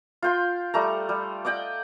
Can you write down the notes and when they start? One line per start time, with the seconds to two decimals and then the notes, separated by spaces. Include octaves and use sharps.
0.22 F4 G5 C6
0.74 G3 A3 A#5
1.09 G3
1.45 D5 D#5 F#5 G5